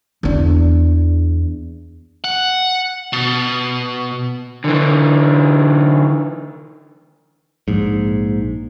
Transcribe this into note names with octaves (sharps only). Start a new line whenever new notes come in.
E2 D4
F#5
B2
D3 E3
A#1 G#2